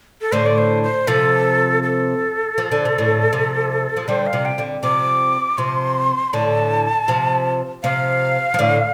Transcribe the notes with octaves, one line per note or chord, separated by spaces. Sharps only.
A4
A2 D3 C5
D5
C5
C5
C3 F3 A4
A4
F3
D3
C3
A2 D3
C3 F3
F3
D3 G3 C5
F5
C3 F3
G5
D3 G3
C3 F3 D6
C3 F3 C6
A2 D3 A5
C3 F3
C3 F3 F5
F3
A2 D3